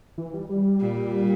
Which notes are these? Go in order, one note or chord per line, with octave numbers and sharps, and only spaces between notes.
E3
G3
G3
A#2